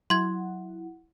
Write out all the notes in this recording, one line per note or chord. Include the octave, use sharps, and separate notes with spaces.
F#3 E4 F#5 C6 G#6